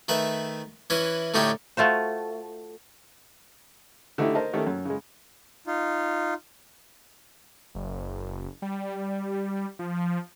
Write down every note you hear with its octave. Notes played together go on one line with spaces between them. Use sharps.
D#3 A3 B4 E5
E3 C#4 E4 B4
A2 D3 A3 C#4 D#4 G4
A3 F4 F#4 C5
D3 A3 D#4 E4 G4
A#4 C5 D#5 A5
D#3 A3 C#4 G4 A4
F#2
C#3 G#3
D#4 F4
F#1
G3
F3